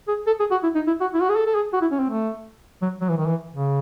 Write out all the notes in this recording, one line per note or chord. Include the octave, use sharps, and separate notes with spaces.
G#4
A4
G#4
F#4
E4
D#4
E4
F#4
E4
F#4
G#4
A4
A4
G#4
F#4
E4
C#4
C4
A3
F#3
F#3
E3
D#3
E3
C#3